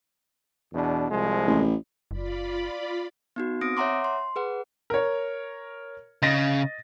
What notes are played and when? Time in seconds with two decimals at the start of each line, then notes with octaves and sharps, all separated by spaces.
0.74 E2 B2 D4
1.10 C2 F3 G#3
1.47 A1
2.11 F#1 F4 D5 B5
3.36 B3 D#4 F#4
3.61 C4 D#6 A#6 D7
3.77 C#5 E5 F#5 A#5 C6 D6
4.04 C6
4.36 G#4 B4 F#5
4.90 A#4 C#5
6.22 C#3 D#5 A6 A#6